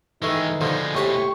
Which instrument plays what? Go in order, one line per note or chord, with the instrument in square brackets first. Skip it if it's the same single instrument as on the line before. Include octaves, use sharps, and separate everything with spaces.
[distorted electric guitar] D#3 G#3 [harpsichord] E3 A3 [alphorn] D#4
[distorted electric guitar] B2 G#3 [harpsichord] D3 F3
[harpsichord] A2 A5 B5 [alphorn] G4 [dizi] C#6